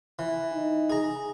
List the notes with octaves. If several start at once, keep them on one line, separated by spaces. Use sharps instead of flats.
E3
D#4
G#4 A#5